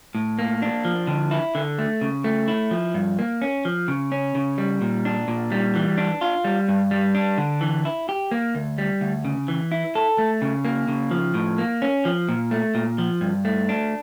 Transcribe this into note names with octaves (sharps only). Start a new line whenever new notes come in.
A2
A#3
D4
F3
D3
E4
D3
A3
C#3
A3
E4
F3
G2
A#3
C#4
F3
C#3
C#4
C#3
G3
A#2
D4
A#2
G3
E3
D4
F4
G3
G2
G3
D4
D3
E3
E4
G4
A#3
D2
G3
D2
C#3
E3
E4
A4
A3
C#3
A#3
C#3
F3
A2
A#3
C#4
F3
A#2
A3
A#2
F3
G2
A3
D4